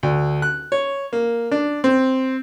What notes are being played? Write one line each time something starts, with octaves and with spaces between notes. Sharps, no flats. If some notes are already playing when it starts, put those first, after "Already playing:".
D2
F#6
C#5
A#3
D4
C4